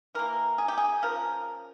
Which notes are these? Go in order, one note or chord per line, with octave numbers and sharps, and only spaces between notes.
E3 A#3 A#4
G#4
G4
G#4
C#3 F3 A#4